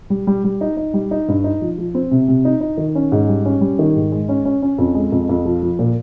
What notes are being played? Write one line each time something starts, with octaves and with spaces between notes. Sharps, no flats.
G3
G3
G3
D#4
D#4
G3
D#4
G2
D#4
F3
F3
C4
C3
C3
D#4
D#4
D#3
C#4
G#2
G3
C#4
G3
D#3
G#2
G#3
C#4
C#4
C#4
F2
G#3
F2
F2
F3
F3
A#2